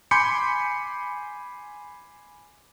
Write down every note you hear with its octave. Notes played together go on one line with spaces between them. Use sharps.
G#5 B5 C6 D6 G6 C#7